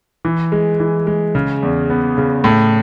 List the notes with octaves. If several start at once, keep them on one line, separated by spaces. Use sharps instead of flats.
E3
G#3
E3
G#3
C#3
E2
B3
C#3
A2